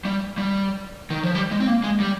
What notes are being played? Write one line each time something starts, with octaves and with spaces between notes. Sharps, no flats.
G3
G3
D#3
F3
G3
G#3
C4
A#3
G#3
G3